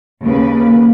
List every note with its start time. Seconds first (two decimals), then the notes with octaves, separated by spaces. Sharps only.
0.23 D#2 C#3 A#3 B4